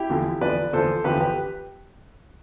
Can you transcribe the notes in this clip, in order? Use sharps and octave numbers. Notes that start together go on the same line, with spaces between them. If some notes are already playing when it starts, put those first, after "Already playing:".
Already playing: E4 G4
E2 D3 F3
E2 D3 F3 B4 D5
E2 D3 F3 A4 C5
E2 D3 F3 G4 B4
G4 B4